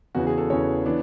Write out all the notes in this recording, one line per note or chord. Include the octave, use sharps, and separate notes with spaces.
E2 C#3 E3 F#4
G#4
A4
E2 C#3 E3 C#5
E3 B3 D4